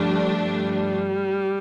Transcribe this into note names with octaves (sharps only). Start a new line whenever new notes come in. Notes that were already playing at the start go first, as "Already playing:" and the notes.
Already playing: G2 F3 G3 A3 D4
G3